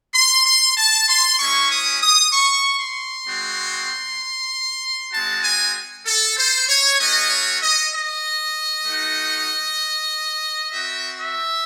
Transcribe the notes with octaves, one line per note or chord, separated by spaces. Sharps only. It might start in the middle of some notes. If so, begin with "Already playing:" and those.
C6
C6
A5
C6
G#3 C#4 E4 C#6
D#6
D#6
C#6
C6
G#3 C4 F#4
G#3 C4 F#4 A5
G#5
A4
C5
C#5
A3 C#4 F#4 D#5
C#5
D#5
D#5
A3 D#4 F#4
C4 F#4 E5
E5